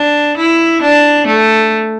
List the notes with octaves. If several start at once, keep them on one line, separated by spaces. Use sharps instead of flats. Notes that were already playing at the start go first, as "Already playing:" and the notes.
Already playing: D4
E4
D4
A3